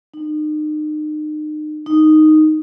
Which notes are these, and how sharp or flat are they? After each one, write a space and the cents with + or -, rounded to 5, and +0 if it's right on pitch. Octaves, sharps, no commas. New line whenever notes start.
D#4 -35
D#4 -5